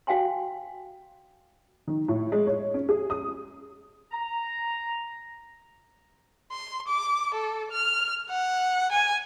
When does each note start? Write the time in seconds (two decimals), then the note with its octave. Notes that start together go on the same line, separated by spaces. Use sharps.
0.07 F#4 F5 G5 G#5 C6
1.87 D#3
2.08 A2
2.32 G#3
2.47 C#5
2.74 C#4
2.89 G#4
3.10 D#6
4.11 A#5
6.52 C6
6.88 D6
7.34 A4
7.72 F6
8.30 F#5
8.92 G#5